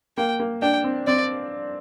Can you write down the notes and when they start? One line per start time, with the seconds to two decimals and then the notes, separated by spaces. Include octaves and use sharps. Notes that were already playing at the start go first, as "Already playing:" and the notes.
0.17 A#3 G5
0.40 A#3
0.62 D4 G5
0.84 C4
1.07 C4 D5